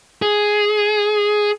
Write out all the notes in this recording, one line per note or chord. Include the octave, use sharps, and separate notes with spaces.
G#4